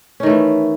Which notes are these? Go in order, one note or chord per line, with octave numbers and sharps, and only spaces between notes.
D#3 E3 A3 C#4